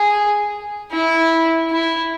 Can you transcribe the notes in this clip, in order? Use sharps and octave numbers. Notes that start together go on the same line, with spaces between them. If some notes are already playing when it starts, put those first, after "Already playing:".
Already playing: G#4
E4
E4